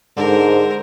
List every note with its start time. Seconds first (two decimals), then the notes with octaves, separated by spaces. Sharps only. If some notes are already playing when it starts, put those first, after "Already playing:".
0.17 G#2 D3 A#4 C5